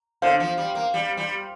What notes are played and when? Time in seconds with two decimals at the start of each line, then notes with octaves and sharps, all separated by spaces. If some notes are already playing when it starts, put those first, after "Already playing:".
0.22 D3 C5 F5
0.40 F3
0.58 G3
0.75 A#3
0.94 G3
1.17 G3